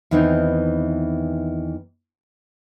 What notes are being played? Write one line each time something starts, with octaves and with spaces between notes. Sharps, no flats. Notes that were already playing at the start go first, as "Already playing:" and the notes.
E2 D#3 E3 C4 C#4 D#4